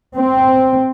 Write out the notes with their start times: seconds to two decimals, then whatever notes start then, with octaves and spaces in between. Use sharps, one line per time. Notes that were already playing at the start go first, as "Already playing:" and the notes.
0.17 C4